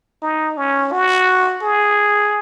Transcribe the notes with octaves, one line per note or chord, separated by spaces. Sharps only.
D#4
C#4
F#4
G#4